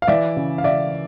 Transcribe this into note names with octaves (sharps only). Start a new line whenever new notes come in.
F5
E3 D5 E5
C#3
F5
C#3 D5 E5